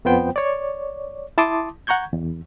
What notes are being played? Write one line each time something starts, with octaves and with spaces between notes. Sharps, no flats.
F2 F3 B3 C5 G5
C#5 D5
E4 A5 C6 D6 D#6
F#5 A#5 C#6 G6 G#6
E2